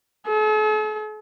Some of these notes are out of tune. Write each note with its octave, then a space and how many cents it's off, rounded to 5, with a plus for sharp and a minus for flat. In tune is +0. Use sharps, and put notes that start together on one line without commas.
A4 -45